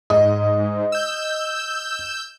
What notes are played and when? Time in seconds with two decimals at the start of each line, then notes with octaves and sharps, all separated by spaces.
0.10 G#2 D#5
0.92 E6 G6